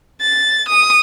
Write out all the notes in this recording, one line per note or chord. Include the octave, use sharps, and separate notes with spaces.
A6
D#6